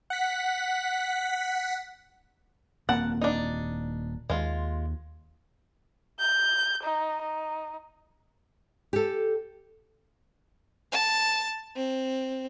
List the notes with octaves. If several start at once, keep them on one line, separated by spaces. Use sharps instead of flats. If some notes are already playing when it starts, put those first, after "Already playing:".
F#5 B6
D#1 A#3 C4 A#4 F#5 A5
D4 D#4
D#2 G#3 F4
G6
D#4
D#4
G4 A4
A5
C4